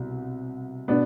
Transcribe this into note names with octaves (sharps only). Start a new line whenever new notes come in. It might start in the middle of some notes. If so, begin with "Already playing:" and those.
Already playing: C2 B2
B2 B3 D4